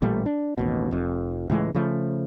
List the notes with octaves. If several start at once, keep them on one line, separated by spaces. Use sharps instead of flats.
A1 A#2 G3 A3
D4
A1 D#2 B2
F1 F2
C#2 A2 E3 G#3
C#3 F3 A3